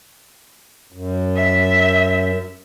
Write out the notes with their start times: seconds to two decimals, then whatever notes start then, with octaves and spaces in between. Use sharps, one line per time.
0.93 F#2
1.36 E5